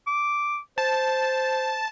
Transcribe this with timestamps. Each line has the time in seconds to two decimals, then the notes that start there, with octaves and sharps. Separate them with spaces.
0.07 D6
0.78 C5 A5